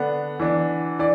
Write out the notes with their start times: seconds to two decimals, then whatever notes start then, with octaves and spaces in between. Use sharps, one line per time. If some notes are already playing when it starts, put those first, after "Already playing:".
Already playing: D3 B3 D4 F#5
0.40 E3 D4
0.99 E3 D5